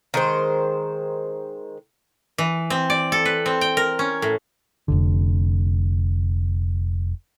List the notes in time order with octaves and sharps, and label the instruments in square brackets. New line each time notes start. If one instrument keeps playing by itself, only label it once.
[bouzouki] D#3 G#3 C5
[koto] E3
C4
D5
A4
B4
C4
G5
A#4
C#4
A2
[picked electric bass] F1 B1 D3